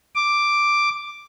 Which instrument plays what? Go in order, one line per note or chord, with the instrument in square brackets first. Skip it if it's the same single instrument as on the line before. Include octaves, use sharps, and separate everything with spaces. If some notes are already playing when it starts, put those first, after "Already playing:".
[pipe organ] D6